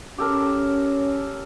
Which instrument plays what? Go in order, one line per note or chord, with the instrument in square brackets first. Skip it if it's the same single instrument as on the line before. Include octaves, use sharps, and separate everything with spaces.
[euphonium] C#4 [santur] G4 A4 A#4